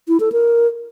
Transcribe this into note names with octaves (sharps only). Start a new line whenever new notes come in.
E4
A4
A#4